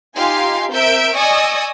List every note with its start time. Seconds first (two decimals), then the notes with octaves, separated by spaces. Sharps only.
0.17 D#4 F4 G4 F5 G#5 C6
0.72 C4 A#4 E5 E6 G6 D7
1.16 D5 D#5 G#5 C#6 D#6 E6